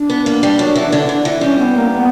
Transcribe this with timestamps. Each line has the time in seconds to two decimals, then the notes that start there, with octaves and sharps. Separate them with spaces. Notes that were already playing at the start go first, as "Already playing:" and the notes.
Already playing: D4
0.10 B3
0.26 A#3
0.43 G3
0.59 F#3
0.76 E3
0.92 D3
1.09 D3
1.25 E3
1.41 G3 C#4
1.59 B3
1.75 A#3
1.92 B3